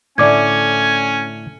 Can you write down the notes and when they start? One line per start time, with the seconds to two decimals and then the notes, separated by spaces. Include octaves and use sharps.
0.18 A2 D3 A3 C#4 D5 G#5 D6 G#6